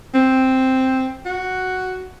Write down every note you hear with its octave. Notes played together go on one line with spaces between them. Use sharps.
C4
F#4